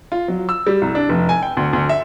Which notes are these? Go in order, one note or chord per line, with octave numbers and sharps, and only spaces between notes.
F4
F#3
E6
G3
C2
D4
F1
G#5
G5
D2
D2
E5